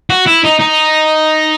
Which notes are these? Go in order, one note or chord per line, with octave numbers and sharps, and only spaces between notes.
F#4
E4
D#4
D#4